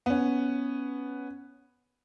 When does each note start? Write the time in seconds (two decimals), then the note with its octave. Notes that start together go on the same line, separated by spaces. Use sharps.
0.06 B3 C#4